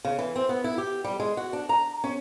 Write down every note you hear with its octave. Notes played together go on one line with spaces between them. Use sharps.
C#3
E3
C4
B3
E4
G4
G3
G#3
F#4
D4
A#5
C#4